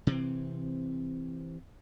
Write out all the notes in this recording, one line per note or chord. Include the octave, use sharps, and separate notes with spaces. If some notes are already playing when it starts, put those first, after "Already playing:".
C3 E3 C4